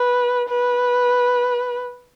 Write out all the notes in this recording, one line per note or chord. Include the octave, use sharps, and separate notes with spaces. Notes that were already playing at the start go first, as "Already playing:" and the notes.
Already playing: B4
B4